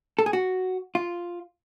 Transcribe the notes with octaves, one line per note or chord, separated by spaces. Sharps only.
A4
G#4
F#4
F4